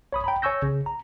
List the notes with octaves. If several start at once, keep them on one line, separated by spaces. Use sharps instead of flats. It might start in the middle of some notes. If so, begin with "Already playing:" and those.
C#5 B5 D#6
G5 A#5 B5
C#5 G#5 C#6 E6 G6 A#6
C#3
A#5